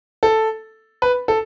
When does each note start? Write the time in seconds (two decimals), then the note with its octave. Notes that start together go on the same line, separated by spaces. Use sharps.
0.23 A4
1.02 B4
1.28 A4